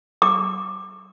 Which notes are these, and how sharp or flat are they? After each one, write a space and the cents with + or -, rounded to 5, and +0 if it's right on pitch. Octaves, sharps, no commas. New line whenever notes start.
D6 +20